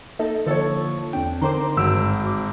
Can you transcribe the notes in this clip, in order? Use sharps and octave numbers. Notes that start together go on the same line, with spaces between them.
A#3 D#4 A4
D3 E3 F3 A4 C#5
E2 C4 D4 G5
D3 C4 D#4 A#4 C5 A#5 C6 D6
G#1 G2 F#4 E6 D7
D6